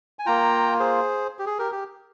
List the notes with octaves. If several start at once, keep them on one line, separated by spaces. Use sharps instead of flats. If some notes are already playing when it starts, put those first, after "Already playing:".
G#5
A#3 F4 G5 A#5
G#4 C5
G4
G#4
G4 A#4
G4